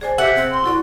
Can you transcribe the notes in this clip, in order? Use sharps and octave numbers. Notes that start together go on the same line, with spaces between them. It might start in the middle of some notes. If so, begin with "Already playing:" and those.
G#4 C5 D5 G#5
C3 G4 A4 E5 F#5 F#6
C4 G#4 F#6
C6
E4 F#4 A4 D5